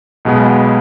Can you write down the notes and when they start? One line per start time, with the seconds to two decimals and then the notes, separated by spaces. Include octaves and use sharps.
0.25 B1 B2 G#3 B3